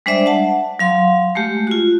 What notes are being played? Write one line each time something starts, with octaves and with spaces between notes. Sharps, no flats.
G3 G#3 D4 C5 D5 E5
F#5 A5
F#3 F5 C6
G#3 A3 G4
F4 F#4